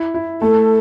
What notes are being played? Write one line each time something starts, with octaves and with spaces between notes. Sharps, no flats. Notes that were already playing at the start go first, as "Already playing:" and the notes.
Already playing: E4
E4
A3 A4